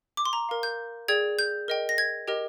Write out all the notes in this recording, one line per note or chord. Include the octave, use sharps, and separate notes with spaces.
D6
C6
A#5
A#4 F5
G6
G#4 D5 G5 G#6
G6
A#4 D#5 G5
A#6
G#6
G4 A#4 D#5 G5